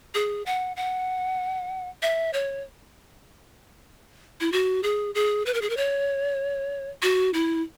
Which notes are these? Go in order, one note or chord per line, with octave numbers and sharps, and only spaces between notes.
G#4
F#5
F#5
E5
C#5
E4
F#4
G#4
G#4
B4
A#4
G#4
A#4
C#5
F#4
E4